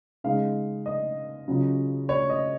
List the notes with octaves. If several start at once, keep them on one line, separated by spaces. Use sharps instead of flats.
C#3 G#3 D#4 F5
D#5
C#3 F#3 C#4 F4
C#5
D#5